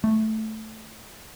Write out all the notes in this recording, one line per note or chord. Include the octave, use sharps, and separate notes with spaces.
A3